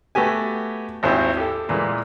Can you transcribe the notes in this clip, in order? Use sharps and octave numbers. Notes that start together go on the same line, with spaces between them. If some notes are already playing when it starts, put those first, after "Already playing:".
A3 B3 F#4 G4 G#5
G#1 D#2 C4 E4 C5
G4 A4
A#2 E3 G#3 A#3